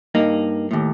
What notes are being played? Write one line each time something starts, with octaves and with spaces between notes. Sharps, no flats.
G2 A#3 D#4
D#2 A2